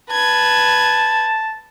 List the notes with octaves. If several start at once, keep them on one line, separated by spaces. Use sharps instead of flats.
B4 A5 G#6